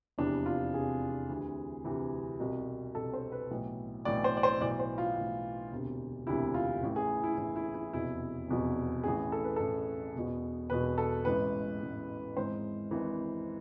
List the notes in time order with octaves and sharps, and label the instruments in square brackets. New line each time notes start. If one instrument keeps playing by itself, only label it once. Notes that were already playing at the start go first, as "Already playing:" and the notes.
[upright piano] F1 E2 C3 E3 D4
F4
F1 E2 C3 E3 G#4
D2 C3 E3
D2 C3 E3
C2 B2
C2 B2 A4
C5
B4
B1 A2 E3
B1 A2 E3 D5
C5
D5
C5
B1 A2 E3 D5
C5
F4
B1 A2 E3
E1 D2 C3
E1 D2 C3 E4
F4
A1 A2 E3
G#4
E4
A1 A2 E3 E4
E4
E4
F1 E2 B2 E4
F1 E2 B2
A1 A2 E3 G#4
A4
B4
A1 A2 E3 A4
E1 E2 B2
E1 E2 B2 B4
A4
A1 G#2 E3 B4
A1 G#2 E3
G#1 G#2 E3 C5
G#1 G#2 E3